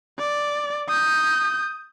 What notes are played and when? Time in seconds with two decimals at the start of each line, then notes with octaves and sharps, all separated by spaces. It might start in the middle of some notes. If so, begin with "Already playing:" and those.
0.19 D5
0.89 D#6 G6